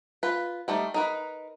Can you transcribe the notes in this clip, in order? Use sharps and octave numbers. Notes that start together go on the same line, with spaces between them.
F4 B4
G3 A3 D#4
D#4 A#4 B4